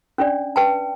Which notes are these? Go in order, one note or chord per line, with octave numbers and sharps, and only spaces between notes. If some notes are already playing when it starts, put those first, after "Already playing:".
C#4 D4 D5
B4 G5 A5